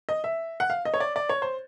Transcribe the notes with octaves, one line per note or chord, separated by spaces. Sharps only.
D#5
E5
F#5
F5
D#5
C#5
D5
D5
C#5
C5